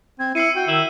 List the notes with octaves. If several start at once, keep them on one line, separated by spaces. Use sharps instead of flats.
C4 G#6
E4 E6 C7 C#7 D#7
F#4 G5
D#3 E4